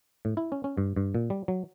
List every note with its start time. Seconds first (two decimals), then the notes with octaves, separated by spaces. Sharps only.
0.25 A2
0.37 E4
0.52 C#4
0.64 C#4
0.77 G2
0.96 G2
1.15 A#2
1.30 G3
1.48 F#3